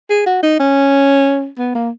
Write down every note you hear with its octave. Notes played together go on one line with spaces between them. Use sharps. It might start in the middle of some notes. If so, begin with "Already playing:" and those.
G#4
F#4
D#4
C#4
B3
A#3